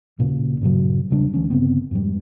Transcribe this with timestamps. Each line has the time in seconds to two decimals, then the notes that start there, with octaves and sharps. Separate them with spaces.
0.19 D#2 A#2 C#3
0.61 G2 A#2 C#3 F#3
1.10 E2 C#3 G3 D4
1.34 D2 E3 C#4
1.50 G1 C#3 B3 C4
1.91 F2 G#2 G3